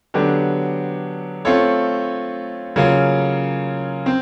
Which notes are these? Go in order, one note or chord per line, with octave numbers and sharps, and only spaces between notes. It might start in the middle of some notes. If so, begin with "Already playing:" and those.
D3 F#3 B3 D4 G4
A3 C4 F4 A4 C#5
C#3 F#3 A#3 C#4 F4
C4